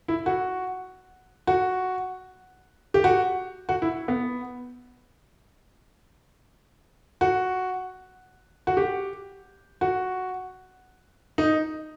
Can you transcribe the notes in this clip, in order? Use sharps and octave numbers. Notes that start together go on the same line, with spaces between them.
E4
F#4
F#4
G4
F#4
F#4
E4
B3
F#4
F#4
G4
F#4
D#4